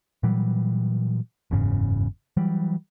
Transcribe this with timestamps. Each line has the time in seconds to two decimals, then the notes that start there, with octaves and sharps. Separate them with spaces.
0.23 A#2 E3 F#3 G3
1.51 F#1 E2 G#2 C#3
2.37 E3 F#3 G3